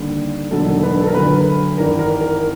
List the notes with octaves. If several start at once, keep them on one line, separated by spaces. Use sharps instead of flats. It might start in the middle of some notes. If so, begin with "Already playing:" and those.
Already playing: D#2 D3 G3
E1 D#2 D3 F#3 A4
B4
A4
A#4
D2 D3 F#3 A3 B4
G#1 G2 E3 A#4
A#4
A#4